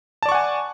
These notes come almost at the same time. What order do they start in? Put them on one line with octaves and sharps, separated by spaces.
A5 D5 C#6 F#5 G#5